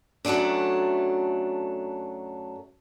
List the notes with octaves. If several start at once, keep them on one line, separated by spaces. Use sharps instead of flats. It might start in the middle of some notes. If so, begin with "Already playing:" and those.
F#2 F#3 G#3 A3 D4